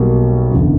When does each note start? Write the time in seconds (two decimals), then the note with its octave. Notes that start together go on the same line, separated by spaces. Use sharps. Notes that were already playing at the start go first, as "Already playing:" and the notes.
Already playing: B1 B2 G3 A#3
0.52 F#1 E2 D3